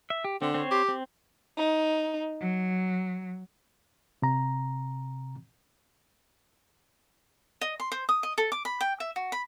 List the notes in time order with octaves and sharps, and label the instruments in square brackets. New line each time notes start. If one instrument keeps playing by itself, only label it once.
[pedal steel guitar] E5
G4
[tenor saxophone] D3 [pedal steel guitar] C4
[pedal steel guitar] C4 C5 C#5
[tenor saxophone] G4
[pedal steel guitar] C4
[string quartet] D#4
F#3
[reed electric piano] C3 A#5
[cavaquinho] D#5
C6
C5
D#6
D#5
A4
D6
B5
G5
E5
F#4
B5